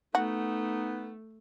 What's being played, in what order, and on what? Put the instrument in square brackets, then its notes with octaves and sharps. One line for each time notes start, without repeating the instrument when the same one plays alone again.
[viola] A3 [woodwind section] B3 D#4 [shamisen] F#4